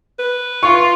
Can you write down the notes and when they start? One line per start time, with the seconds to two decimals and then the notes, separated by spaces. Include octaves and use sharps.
0.19 B4
0.63 F4 C#6